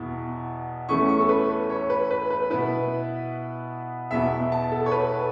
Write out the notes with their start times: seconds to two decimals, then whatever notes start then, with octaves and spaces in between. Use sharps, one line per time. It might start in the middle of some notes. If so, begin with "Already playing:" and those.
Already playing: E2 B2 B3 E4
0.89 E2 E3 A3 C#4 E4 C#6
1.09 C#6
1.20 A4
1.29 B4
1.70 C#5
1.90 B4
2.11 B4
2.30 B4
2.50 B2 B3 E4 B4
4.11 E2 B2 B3 E4 E5
4.52 A5
4.72 A4
4.86 C#5
4.91 B4